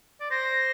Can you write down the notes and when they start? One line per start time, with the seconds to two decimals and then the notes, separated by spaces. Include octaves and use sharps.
0.20 D5
0.31 C5 A#6